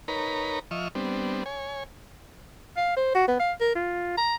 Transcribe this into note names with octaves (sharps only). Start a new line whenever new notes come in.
D#4 A#4 B4 C#5 A#5 B5
F3 D#5 E5 C#6 F6
G3 B3 C4 D4
C#5 G#5
F5
C5
F#4
B3
F5
A#4
F4
A#5